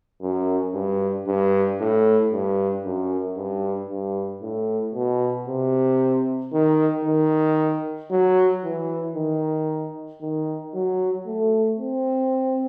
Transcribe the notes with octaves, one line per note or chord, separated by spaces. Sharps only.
F#2
G2
G2
A2
G2
F#2
G2
G2
A2
B2
C3
D#3
D#3
F#3
E3
D#3
D#3
F#3
A3
C4